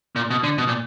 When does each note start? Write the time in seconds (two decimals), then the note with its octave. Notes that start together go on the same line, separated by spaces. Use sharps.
0.16 A#2
0.30 B2
0.43 D3
0.58 B2
0.68 A#2